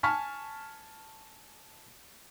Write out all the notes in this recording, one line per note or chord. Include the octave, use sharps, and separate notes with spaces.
G#5 A5 C#6 F6 B6